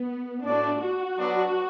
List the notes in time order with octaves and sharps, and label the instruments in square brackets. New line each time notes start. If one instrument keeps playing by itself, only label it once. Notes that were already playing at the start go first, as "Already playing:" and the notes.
Already playing: [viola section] B3
[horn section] A2 A3 F#4 D5 [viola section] D4
[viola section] F#4
[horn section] F#3 B3 D4